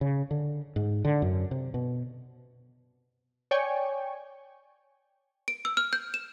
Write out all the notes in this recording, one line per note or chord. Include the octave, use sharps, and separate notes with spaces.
C#3
D3
G#2
D3
F#2
C3
B2
C#5 D5 G5 G#5 C#6
D7
E6
F6
G6
E7